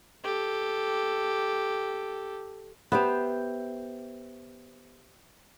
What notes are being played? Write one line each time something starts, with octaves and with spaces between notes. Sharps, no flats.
G4 A4
B3 G4 C5 E5